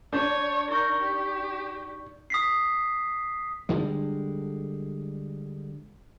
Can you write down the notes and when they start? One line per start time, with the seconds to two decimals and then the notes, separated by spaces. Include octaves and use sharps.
0.13 D4 C#5 A5 G6
0.70 D#4 A#4 C#6 G6
1.01 G4
2.30 D#6 B6 C7
3.69 D3 G3 G#3